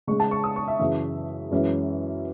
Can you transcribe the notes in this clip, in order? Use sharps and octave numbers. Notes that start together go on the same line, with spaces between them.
C#3 G#3 C#4 C#6
A5
C#6
D#6
C#6
E5
F#2 C#3 E3 E5
F#2 E3 G#3 C#4